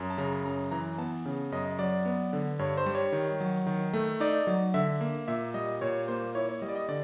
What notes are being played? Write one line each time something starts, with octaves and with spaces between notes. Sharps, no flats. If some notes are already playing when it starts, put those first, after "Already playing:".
Already playing: F#2
A5
C#3 A#5
F#2 A#5
E3 A#5
B3 A5
C#3
F#2 D#5
F#3 D5
B3
D3
G2 C#5
C5
G3
C#5
D#3
F#3
D#3
A3
D#4 D5
F#3
D3 E5
A#3
A#2 E5
G3 D#5
A#2 C#5
A#3 C5
E4 C#5
C#5
G3 D#5
D5
D#5
D3 D5